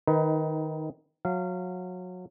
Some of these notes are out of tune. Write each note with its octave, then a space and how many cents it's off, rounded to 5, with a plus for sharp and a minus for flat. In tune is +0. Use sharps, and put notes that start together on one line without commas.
D#3 +0 D#4 +25 B4 +15
F#3 -25 F5 -20